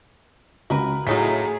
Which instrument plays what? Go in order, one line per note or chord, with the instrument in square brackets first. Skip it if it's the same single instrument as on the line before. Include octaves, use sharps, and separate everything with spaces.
[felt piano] C#2 [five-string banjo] F#4 A#4 B4
[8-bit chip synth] A2 [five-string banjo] F#3 D#4 F4 [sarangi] G#4 [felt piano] B6